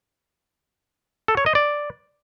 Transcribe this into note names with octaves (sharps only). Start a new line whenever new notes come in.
A4
C#5
D#5
D5